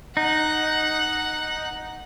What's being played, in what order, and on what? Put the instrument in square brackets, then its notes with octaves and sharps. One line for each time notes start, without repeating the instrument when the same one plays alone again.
[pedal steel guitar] D#4 [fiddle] F#5